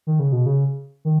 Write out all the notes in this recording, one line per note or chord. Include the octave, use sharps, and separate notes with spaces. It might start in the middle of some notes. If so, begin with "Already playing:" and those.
D#3
C#3
B2
C#3
D#3